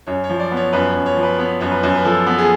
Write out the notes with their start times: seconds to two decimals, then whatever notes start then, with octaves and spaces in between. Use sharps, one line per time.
0.07 F#2 C#5
0.24 C#5
0.29 F3
0.40 D5
0.51 B3
0.57 C#5
0.73 F#2 B4
0.89 C#5
0.95 F#2
1.06 C#5
1.17 F3
1.23 B4
1.38 B3 C#5
1.61 F#2 C#5
1.72 B4
1.83 F#2
1.94 B4
2.05 F3 A4
2.27 B3
2.38 G#4